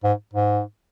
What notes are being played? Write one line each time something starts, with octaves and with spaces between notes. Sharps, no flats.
G#2
G#2